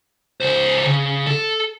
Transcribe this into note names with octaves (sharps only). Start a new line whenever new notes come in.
C#2 C5
C#3
A4